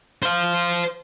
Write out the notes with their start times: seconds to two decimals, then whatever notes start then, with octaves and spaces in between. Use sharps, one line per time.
0.23 C5 F5